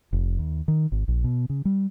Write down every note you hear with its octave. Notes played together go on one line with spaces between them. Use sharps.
F1
D#2
D#3
G#1
A#1
B2
C#3
G3